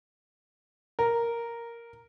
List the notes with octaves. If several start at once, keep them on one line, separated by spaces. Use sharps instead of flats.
A#4